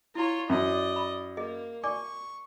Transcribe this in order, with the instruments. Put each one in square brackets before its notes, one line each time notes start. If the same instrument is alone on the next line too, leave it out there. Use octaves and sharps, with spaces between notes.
[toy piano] E4 A#5 [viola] F4 C#5
[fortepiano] F#2 [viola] D5 D#5
[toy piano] B5
[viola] A#3 [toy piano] G#4 D#5
[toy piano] D5 D6 [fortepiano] G#5 [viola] C#6